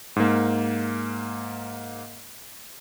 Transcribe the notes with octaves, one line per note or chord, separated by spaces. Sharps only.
G#2 A#3